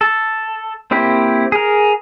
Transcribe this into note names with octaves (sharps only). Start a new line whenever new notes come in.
A4
A#3 C4 E4 G4
G#4 A#4